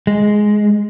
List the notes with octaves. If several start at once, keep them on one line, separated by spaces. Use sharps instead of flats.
G#3